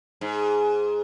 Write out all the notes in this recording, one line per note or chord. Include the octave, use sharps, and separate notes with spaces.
G#2